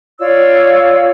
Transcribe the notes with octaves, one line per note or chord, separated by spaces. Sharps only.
F4 C#5 D5 E6